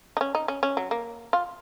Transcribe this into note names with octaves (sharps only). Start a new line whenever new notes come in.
D#4
C#4
D#4
C#4
C#4
F#3
A#3
F4